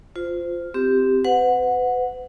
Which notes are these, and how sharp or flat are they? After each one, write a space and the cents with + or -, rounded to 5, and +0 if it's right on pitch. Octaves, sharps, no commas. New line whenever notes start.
F4 +0 C5 -20
C4 -10 G4 +0
B4 +35 F#5 -15